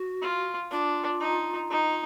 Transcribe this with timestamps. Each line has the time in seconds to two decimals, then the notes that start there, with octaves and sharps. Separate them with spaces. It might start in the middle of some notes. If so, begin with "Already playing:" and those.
Already playing: F#4
0.22 F4
0.71 D4 F4
1.21 D#4
1.71 D#4